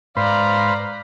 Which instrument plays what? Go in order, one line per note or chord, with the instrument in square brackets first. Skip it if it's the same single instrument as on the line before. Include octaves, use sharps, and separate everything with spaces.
[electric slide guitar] G#2 [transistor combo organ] B4 C5 [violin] D5 A#5 [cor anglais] F5